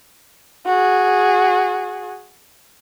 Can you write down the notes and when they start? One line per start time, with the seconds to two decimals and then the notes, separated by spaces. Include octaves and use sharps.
0.66 F#4 G#4